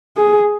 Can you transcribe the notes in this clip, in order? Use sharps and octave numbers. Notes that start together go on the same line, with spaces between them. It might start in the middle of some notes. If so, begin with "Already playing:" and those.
G#4